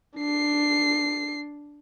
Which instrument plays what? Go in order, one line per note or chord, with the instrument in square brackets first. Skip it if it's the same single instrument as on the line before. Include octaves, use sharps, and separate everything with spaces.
[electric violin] D4 C7